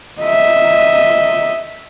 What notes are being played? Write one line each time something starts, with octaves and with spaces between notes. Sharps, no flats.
D#5 E5